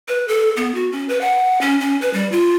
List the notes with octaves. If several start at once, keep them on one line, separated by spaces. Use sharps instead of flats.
B4
A4
B3
F#4
C#4
B4
F#5
C#4
C#4
B4
G3
F4